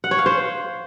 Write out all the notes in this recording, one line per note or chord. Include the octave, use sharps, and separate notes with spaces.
F#5
C#5
F5
C5